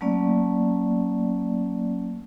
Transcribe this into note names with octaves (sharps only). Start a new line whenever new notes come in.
F#3 A3 A#3 C#4 D5